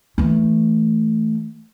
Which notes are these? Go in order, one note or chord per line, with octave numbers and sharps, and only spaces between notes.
E3 A3